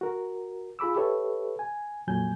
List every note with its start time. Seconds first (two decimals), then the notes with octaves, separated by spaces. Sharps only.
0.01 F#4 A#4
0.79 F4 G#4 B5 D6 E6
0.96 G4 A4 B4 C#5 E5
1.59 G#5
2.07 F2 A#2 F#3 G#5 G6